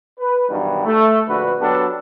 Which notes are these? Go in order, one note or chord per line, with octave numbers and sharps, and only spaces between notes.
B4
G2 B2 D#3 E3 F#3 G3
A3
A#1 D3 F#4 B4
F#3 B3 D4 G4 A4 B4